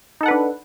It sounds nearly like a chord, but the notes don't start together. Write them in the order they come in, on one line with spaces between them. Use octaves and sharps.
D#4 A4 F#5 B4 D4